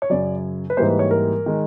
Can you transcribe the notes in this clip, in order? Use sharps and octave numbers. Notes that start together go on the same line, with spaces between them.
C#5
F#2 C#3 F#3 D5
B4
G#2 E3 G3 A#3 C5
B4
C#5
A#4
D#3 G#3